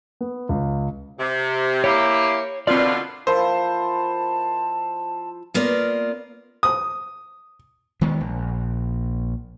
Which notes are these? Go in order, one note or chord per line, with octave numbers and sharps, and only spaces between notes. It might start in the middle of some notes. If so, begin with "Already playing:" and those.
B3
C#2
C3
A#3 E4 G4 C#5
B2 D3 C4 F4 A#4 D5
F3 E4 A#4 C5 A5
A#3 B3 F4 A#4 D5
D#6
D#3 G#3 B3
A#1